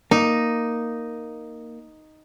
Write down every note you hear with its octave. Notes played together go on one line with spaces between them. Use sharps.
A#3 D#4